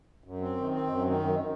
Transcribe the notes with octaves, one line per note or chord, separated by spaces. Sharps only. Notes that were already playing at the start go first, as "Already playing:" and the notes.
F#2
C4
D#3
C4
F#2
D#3
F#2